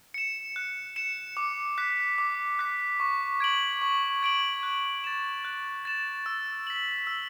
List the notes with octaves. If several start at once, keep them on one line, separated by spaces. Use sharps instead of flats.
C#7 E7
F#6
C#7 E7
D6
F#6 B6
D6
F#6 B6
C#6
G#6 D7 F#7
C#6
G#6 D7 F#7
F#6
A6 E7
F#6
A6 E7
E6
B6 F#7
E6